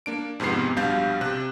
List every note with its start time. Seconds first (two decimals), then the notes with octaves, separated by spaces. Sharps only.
0.06 A#3 D4 D7
0.40 F2 G#2 C3 B3 C7
0.76 A#1 B2 G3 D4 F5 G6
1.21 C3 F#6